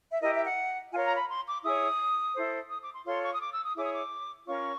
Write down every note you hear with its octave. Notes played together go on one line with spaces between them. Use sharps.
E5
E4 G4 A#4 D#5
E5
F#5
F4 A#4 C#5 G#5
A#5
B5
C6
D6
E4 G#4 C#5 D#6
E4 A4 C5
D#6
D6
C6
F4 A4 C#5 C6
C#6
D#6
D6
E6
D#6
E4 G#4 C#5 D6
D#6
D6
C#4 F4 A#4 C#5 C#6